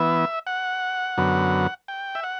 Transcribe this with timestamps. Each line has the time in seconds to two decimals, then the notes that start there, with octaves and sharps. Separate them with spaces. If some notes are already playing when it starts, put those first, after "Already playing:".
Already playing: E3 B3 E5
0.47 F#5
1.18 F#2 D3 F#3 B3
1.88 G5
2.15 E5
2.23 F#5